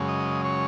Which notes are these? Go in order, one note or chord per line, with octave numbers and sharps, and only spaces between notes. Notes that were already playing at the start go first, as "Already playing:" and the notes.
Already playing: F#2 C#3 G#3
D#5
C#5